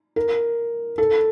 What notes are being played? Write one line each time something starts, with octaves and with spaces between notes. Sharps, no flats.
A#4
A4